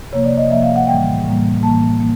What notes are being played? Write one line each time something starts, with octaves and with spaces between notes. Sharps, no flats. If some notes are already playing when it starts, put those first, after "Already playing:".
C3 F3 A#3 C#5
D5
D#5
C3 F3 A#3 E5
F5
F#5
A2 E3 G3 A#3 G5
A2 E3 G3 A#3
A2 E3 G3 A#3 A5
A#3